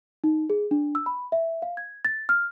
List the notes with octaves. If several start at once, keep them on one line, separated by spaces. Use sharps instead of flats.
D#4
G#4
D4
E6
B5
E5
F5
G#6
A6
F6